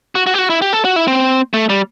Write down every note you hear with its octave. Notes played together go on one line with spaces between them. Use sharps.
F#4
F#4
G4
F#4
E4
G4
A4
F#4
E4
C4
A3
G3